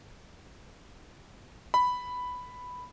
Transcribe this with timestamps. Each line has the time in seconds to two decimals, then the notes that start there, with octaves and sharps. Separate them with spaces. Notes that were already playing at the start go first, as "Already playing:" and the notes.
1.74 B5